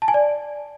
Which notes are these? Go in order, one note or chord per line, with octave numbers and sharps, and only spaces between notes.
A5
G#5
D5